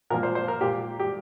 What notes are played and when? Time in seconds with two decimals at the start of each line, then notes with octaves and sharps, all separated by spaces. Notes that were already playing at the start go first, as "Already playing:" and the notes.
0.10 A#2 F3 A#3 A#4
0.23 C5
0.35 C5
0.48 A#4
0.61 A#2 A#3 G4
1.00 G4